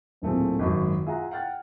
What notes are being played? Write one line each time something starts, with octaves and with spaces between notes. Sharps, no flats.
D1 A#2 A3 C4 G#4
G#1 F#2
F4 G#4 E5 F#5 A#5
F#5 G5 F6 A6